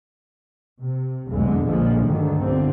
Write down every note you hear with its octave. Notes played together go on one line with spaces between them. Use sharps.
C3
F1 B1 E2 D3 G#3
A#1 A#2 D3 F3 G#3
D2 G2 D3 D#3
G1 G2 D3 C4